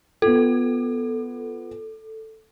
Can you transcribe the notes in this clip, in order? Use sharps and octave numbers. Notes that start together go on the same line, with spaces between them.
B3 F4 A4